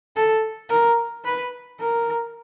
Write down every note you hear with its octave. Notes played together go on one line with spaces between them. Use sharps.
A4
A#4
B4
A#4